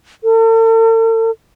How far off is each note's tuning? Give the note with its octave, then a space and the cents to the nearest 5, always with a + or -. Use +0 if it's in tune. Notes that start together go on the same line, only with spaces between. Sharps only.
A4 +45